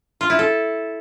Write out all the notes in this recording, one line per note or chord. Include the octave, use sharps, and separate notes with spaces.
F4
E4
A4